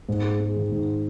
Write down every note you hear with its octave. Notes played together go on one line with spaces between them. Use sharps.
G#2
G#3
G#3
D#3
G#2